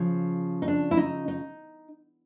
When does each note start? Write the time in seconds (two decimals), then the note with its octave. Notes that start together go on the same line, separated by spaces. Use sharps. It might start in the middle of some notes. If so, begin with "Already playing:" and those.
Already playing: C#3 F3
0.62 D#4
0.68 D4
0.91 E4
0.97 D#4
1.28 D#4